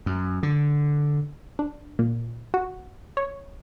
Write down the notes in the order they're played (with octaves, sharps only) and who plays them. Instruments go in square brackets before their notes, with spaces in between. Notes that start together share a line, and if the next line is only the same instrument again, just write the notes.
[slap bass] F#2
D3
[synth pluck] D4
A#2
F#4
C#5